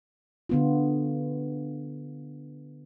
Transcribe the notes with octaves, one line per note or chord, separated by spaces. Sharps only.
D3 B3 F4